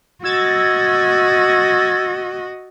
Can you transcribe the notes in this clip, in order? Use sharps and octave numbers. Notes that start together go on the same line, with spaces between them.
F#4 D#5 E6 G#6 A6